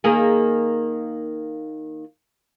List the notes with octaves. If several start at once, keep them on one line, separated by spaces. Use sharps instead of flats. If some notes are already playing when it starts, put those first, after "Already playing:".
D#3 A#3 G#4